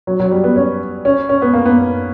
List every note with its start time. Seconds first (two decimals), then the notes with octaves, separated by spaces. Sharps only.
0.07 F#3
0.20 F#3
0.31 G3
0.44 B3
0.56 C#4
1.05 C#4
1.29 C#4
1.42 B3
1.53 A#3
1.65 B3